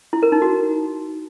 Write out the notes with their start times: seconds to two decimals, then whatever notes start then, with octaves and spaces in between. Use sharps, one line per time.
0.13 E4
0.23 A#4
0.32 D#4
0.42 F#4